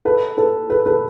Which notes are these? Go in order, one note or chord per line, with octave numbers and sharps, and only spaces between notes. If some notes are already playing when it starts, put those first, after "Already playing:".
A4 B4
A4 B4
A4 B4
A4 B4